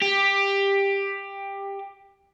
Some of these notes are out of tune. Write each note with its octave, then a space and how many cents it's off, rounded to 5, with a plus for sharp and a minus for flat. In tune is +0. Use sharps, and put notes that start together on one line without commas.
G4 +15